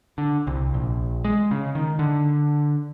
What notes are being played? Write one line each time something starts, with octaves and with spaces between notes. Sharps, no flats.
D3
C2
A#1
G#3
C#3
D#3
D3